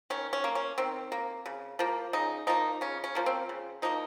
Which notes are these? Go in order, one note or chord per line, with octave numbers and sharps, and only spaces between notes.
D#3 C#4
C#4
A#3
C#4
D#3 C4
A#3
C#3
F3 A#3
C#3 D#4
F3 A#3 D#4
C#3 C#4
C#4
F3 A#3
C4
C#3
F3 A#3 D#4